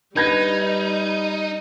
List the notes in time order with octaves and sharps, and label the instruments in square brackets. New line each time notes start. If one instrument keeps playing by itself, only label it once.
[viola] G3 [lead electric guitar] D#4 [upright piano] B4 G#6 A#6